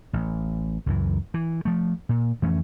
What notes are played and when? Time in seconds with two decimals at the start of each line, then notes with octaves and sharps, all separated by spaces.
0.13 A1
0.86 C#2 F#2 E3
1.34 E3
1.65 F3 A3
2.09 A#2
2.42 F2 E3 A3 C#4